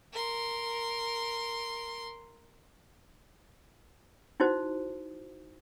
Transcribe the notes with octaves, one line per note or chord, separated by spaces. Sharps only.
A#4 C6
D#4 E4 F#4 C5